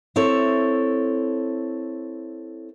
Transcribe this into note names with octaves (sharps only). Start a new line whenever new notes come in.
C4 E4 A4 C#5